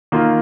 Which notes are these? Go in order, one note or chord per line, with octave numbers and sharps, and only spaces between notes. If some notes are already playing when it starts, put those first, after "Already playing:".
D#3 A#3 F4